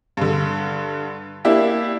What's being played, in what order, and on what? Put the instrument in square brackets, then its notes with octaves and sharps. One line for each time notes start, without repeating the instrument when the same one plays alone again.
[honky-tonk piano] G2 D3
A#3 D4 E4 G4